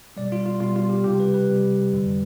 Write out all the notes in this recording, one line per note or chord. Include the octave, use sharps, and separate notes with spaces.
B2 G3 D5
F4
F4
B2 G3 F4
F4
G4
C3 G3 G4
B4
B4
C3 G3
F2 D3 G3